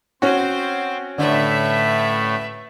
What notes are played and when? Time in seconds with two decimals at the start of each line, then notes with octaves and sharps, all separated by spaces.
0.22 C4 C#4 F#4 C5
1.18 A2 D3 A3 B4 E5